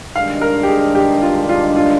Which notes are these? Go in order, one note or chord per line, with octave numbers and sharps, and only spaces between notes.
G2 D#3 G#3 D4 F5
A#4
G4
G#4
G4
F4
F4
F4